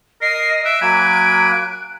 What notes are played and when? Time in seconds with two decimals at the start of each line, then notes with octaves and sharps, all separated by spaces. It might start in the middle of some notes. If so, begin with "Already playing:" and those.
0.21 A#4 D#5 C7
0.65 E5 F#6 D7
0.81 F#3 A#3 G#5 B5